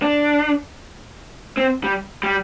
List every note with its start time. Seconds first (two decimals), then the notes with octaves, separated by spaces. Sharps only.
0.02 D4
1.57 C4
1.84 G3
2.23 G3